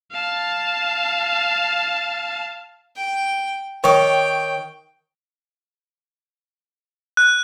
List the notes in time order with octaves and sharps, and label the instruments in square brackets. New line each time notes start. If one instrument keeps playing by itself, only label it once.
[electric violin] F5 A5
[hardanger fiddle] G5
[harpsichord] D#3 [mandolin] C#5 D6 [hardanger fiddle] G5
[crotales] F#6